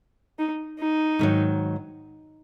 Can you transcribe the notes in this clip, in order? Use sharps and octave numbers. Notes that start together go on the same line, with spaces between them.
D#4
D#4
G#2 D#3 F#3